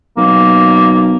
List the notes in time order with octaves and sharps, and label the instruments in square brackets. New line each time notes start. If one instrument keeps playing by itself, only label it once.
[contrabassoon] B1 [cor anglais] A#3